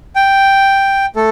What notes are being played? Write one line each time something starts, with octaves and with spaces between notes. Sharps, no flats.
G5
A3 A4